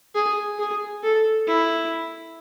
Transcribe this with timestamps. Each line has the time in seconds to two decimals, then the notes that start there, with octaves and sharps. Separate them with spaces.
0.15 G#4
0.59 G#4
1.03 A4
1.47 E4